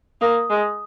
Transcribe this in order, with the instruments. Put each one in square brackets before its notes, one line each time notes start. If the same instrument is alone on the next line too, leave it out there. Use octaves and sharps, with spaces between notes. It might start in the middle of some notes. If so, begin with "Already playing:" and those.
[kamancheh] A#3 [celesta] D#6
[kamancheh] G#3